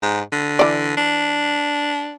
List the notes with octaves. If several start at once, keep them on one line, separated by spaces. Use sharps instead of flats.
G#2
D3
E3 D5
D4